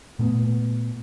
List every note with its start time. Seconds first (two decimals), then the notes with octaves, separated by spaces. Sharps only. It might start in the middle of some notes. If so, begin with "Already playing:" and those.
0.19 A#2 A3 B3